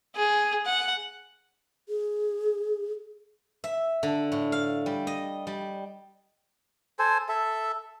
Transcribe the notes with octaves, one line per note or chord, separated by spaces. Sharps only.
G#4
F#5
G#4
E5
D3
A2
F5
G3
D#5
G3
A4 C5 G#5
A4 E5